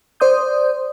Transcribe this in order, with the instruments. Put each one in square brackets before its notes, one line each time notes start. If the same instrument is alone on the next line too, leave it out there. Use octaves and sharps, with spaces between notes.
[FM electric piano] C5 D5 C6 D#6 G6